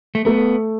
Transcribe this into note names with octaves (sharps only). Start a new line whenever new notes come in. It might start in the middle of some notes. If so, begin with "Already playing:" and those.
A3
A3 B3